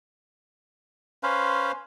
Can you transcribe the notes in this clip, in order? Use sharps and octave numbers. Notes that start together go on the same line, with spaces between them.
C#4 B4 C5 F5